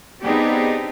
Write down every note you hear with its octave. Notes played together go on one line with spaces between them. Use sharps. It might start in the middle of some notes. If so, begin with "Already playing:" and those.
B3 C4 D4 D#4 G4 G#4